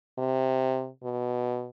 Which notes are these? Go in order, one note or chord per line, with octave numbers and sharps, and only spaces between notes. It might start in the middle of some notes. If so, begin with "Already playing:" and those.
C3
B2